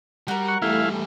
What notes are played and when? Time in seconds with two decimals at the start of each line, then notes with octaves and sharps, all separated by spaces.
0.28 G3 F#4 A#4
0.48 F#5 C#6
0.62 E2 G3 A3 E4 F5